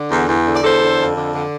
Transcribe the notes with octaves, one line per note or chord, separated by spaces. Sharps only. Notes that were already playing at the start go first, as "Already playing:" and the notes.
Already playing: D3
E2
E2
D3
D5
E2 A4 C5
D3
F2
D3
D3